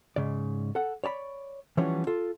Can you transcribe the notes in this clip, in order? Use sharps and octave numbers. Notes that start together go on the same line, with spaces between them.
G#2 C#3 D5
A4 F#5
C#5 D5 A5 B5
E3 F3 G3 B3 C#4 C#5
F4 A4